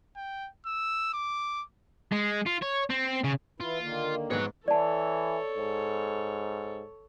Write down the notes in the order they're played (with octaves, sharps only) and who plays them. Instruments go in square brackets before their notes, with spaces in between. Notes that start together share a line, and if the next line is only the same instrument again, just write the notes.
[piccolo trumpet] G5
E6
D6
[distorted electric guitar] G#3
F4
C#5
C4
C#3
[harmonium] E3 E4 [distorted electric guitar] F4
[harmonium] D3 D#3 A#3
[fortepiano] G#2 G#3 B3 [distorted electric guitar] C#5 F#5
[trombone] E3 [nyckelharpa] A4 C#5 [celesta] D5 A5
[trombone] G#2